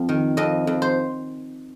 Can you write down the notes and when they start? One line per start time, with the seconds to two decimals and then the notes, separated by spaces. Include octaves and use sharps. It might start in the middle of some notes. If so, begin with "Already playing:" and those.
Already playing: F2
0.09 D#3
0.37 F2 D#5
0.67 F2
0.82 C5